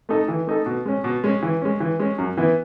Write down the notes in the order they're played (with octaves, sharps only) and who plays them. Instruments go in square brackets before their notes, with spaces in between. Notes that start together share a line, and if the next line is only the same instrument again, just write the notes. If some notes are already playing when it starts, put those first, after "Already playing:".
[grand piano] A3 D#4 A4
E3
A3 D#4 A4
B2
G#3 C#4
B2
G#3 C#4
E3
G#3 C#4
E3
G#3 C#4
F#2
E3 B3 E4